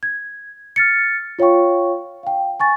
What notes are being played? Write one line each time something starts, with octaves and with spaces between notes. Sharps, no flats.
G#6
F6 A6 C#7
F4 C#5 F5 G5 C#6
F5 G5
G#5 C#6 A6